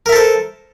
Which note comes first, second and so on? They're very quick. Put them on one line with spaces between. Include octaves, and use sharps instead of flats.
A#4 E5 A4 C5